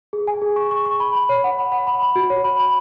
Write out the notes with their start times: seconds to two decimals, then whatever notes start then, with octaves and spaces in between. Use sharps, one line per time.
0.13 G#4
0.27 G#5
0.42 G#4
0.56 C#6
0.71 C#6
0.86 C#6
1.00 B5
1.15 B5
1.29 C#5
1.44 F#5
1.58 B5
1.72 F#5
1.87 B5
2.02 B5
2.16 F#4
2.30 C#5
2.44 B5
2.59 B5